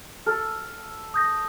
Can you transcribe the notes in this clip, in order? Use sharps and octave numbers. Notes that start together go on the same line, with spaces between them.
A4 F6
D#6 G6 A#6